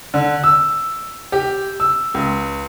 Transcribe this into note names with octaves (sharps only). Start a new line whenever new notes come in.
D3
E6
G4
E6
C#2